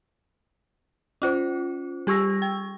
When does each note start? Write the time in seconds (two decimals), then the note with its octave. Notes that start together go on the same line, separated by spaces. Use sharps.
1.22 C#4 F4 C5
2.07 G3 G4 C#6 E6 A#6
2.42 G5